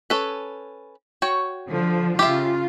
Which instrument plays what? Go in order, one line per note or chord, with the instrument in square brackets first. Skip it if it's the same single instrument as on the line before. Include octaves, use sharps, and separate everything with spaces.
[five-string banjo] C#4 A4 B4
F#4 C#5 G5
[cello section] D3 F3
[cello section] C#3 F4 [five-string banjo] G4 E5